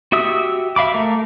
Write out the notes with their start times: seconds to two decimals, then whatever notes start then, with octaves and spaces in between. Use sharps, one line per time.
0.12 F#4 G4 E5 D#6 E6
0.76 E5 F5 B5 D6
0.94 A3 A#4